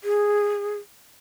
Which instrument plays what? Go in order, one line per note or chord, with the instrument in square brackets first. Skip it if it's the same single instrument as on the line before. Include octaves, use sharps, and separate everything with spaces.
[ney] G#4